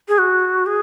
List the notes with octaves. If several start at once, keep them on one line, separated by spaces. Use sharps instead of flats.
G#4
F#4
G#4